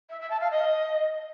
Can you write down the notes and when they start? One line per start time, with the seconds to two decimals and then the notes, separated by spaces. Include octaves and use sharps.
0.10 E5
0.20 E5
0.30 A5
0.41 F5
0.51 D#5